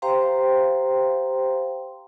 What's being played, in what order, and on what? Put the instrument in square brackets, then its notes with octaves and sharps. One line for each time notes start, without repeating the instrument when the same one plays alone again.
[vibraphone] G4 C5 F5 G5 A#5 C6